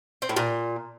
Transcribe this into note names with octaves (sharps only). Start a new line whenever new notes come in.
C4
A2
A#2